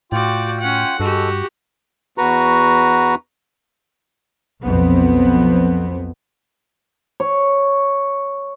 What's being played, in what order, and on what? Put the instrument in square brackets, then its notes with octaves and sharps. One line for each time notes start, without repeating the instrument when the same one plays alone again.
[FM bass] A2 [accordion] F4 G5 [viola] F#4 D5
[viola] C#4 F#5
[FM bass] G2 [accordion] G#3 A4 [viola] F#4 G4
[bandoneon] E2 F#4 B4 A#5 C#6
[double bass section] B1 F2 B3 C4
[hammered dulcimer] C#5